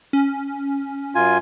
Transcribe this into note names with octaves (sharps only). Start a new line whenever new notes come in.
C#4
F#2 F4 G#5